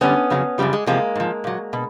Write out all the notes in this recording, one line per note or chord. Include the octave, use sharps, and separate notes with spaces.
F#2 D3 G3 B3 C#4
F2 C#3 F#3
F#2 C#3 F3 G3
G#3
E2 C3 F3 G#3 A#3
G#2 F3
A#2 F#3
B2